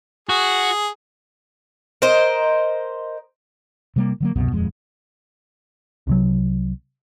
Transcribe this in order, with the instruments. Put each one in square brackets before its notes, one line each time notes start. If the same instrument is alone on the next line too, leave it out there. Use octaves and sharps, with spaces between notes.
[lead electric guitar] F#4 [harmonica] G#4
[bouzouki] A#4 C5 D#5
[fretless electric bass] C3 G3 A#3
D3 F#3 A#3
C2 F#2 B2
D#1 F2 G#3
[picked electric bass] C2 C3 F#3